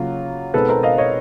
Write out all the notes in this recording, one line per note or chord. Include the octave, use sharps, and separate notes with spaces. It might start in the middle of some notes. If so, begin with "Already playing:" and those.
Already playing: C#3 F#3 A#3 F4
B2 G#3 C4 D#4 A4 B4
A#4 C5
D#5 F5
C#5 D#5